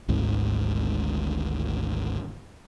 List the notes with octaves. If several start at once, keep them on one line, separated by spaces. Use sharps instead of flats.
G#1 D2 G#2